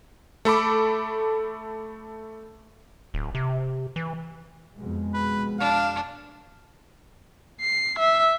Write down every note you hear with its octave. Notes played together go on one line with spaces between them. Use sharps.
A3 A4 B5 D6
D1
C3
E3
F2 B2 G#3
B4
D4 F5
C7
E5